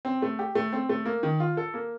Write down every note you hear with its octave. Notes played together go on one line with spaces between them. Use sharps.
C4
A3
G4
A3
C4
A3
A#3
D#3
F4
A4
A#3